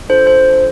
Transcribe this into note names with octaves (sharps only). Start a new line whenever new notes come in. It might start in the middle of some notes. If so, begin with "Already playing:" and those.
D4 F4 A4 C5
C5